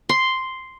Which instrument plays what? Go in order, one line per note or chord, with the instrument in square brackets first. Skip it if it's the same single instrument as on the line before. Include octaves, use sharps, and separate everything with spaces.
[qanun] C6